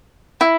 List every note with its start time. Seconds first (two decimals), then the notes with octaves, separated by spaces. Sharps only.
0.41 E4